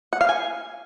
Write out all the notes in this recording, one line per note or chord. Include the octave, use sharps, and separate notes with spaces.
F#5
F5
G#5